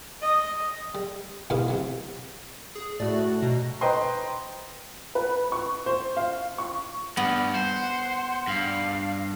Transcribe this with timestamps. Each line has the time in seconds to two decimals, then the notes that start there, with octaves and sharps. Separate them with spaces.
0.22 D#5
0.95 G3
1.50 G#2 B2 E3 G4 B4 F5
1.68 C3 F#3
2.75 G#4
3.00 A2 A3 F#4 D5
3.42 B2 A#5
3.81 B4 C5 D#5 G5 A#5 C6
5.15 B4
5.52 C#6
5.86 C5
6.17 F5
6.58 C#6
7.17 G2 B3 F#5
7.55 C5
8.47 G2 F5